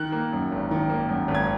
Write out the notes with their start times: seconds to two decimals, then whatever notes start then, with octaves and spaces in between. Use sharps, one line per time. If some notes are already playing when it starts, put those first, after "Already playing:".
Already playing: D#3 F#6
0.12 A#3
0.33 F#2
0.52 G#1
0.71 D#3
0.90 A#3
1.09 F#2
1.28 G#1
1.35 G#6